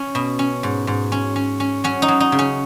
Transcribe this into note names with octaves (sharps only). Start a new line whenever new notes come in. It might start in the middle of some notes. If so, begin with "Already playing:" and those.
Already playing: C#4
B2
C#4
G#2
G#2
C#4
C#4
C#4
F#3 C#4
D#4
F#3
D#4
C#3
C#4